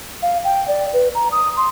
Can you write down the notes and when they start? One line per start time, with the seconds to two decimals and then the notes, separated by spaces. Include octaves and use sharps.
0.23 F5
0.44 G5
0.68 D5
0.93 B4
1.15 A#5
1.32 D#6
1.57 C6